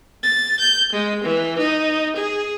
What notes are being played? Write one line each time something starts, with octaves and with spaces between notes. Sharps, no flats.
A6
G6
G#3
E3
D#4
G#4